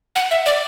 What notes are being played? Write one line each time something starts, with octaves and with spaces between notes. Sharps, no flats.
F#5
E5
D5